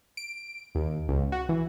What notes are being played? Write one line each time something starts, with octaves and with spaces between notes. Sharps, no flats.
D7
D#2
C#2
F#4
E3